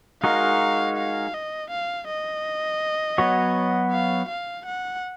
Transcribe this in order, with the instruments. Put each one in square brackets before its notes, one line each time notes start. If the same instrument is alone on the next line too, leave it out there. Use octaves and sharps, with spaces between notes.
[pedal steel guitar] G#3 D#4 F#4 A#4 [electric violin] F5
[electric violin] F5
D#5
F5
D#5
[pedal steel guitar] F#3 B3 F#4 C#5
[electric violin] F5
F5
F#5